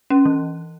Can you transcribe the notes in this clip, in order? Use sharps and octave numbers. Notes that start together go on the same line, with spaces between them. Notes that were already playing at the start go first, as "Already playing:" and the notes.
C#4
E3